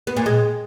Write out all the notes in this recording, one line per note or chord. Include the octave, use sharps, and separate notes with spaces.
B3
A#2
G#3